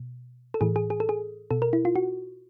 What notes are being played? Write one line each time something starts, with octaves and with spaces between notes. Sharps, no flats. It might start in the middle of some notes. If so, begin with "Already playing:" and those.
Already playing: B2
A4
A2 E3 G#4
G#4
G#4
A4
G#4
B2 A4
A#4
E4
F4
F#4